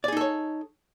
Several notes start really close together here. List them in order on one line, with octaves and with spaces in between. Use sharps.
D5 G#4 D#4 A4 C#5